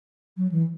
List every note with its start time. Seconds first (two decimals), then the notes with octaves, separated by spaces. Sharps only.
0.37 F#3
0.51 E3